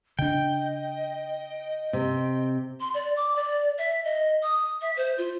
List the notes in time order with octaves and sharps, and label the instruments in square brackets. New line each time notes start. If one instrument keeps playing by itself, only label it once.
[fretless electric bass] C#3 D4 [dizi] D#5 [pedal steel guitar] G5
[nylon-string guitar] C3
[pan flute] C6
D5
D6
D5
E5
D#5
D#6
E5
C5
F4